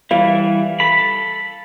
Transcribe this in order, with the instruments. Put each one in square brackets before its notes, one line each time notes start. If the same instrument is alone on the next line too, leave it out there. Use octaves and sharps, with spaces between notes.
[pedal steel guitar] E3 G3 E4 [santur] F5
[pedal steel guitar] A4 B5